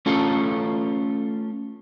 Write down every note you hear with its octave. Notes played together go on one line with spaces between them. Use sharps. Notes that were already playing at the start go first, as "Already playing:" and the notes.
A3 C#4 F4 A4